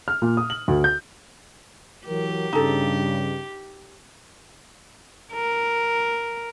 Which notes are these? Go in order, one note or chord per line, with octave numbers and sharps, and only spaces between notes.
F6
A#2
D#6
F#7
D2
G6
E3 F#3 G4 A#4
G2 C#3 D#4 A4
A#4